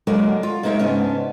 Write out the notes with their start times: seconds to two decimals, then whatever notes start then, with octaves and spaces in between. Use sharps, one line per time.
0.07 D3 F#3 G#3 A#3 F#4 A#4
0.43 F4
0.63 G#3 A#3 D#4 A#4 C#5 E5
0.79 G#2 C#3 B3 C#4 D4